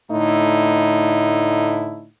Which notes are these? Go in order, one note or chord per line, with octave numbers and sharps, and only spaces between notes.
A2 D3 A3 D#4 E4